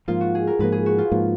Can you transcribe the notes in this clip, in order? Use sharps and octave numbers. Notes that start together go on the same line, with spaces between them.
G#2 F3 A#3 F4
F#4
G#4
A#4
G#2 F3 A#3 B4
G#4
F#4
F4
G#2 F3 A#3